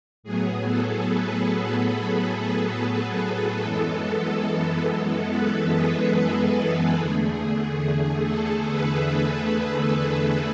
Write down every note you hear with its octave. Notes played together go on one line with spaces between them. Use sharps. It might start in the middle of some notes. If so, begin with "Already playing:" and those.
A2 F#3 B3 G#4
A4
B4
A4
F#2 E3 G#3 B3 A4
A4
B4
G#4
E2 D3 A3
G#4
A4
B4